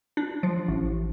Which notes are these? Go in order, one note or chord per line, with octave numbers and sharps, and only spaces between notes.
D4
F3
A1